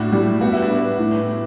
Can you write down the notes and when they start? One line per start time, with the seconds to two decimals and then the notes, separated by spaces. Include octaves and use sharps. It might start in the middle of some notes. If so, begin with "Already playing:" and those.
Already playing: A2 D4 F#4
0.12 G3
0.41 B3 F#4
0.52 E4
0.62 D4 F#4
0.70 B3
0.99 A2